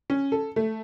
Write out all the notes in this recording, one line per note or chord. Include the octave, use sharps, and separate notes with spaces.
C#4
A4
A3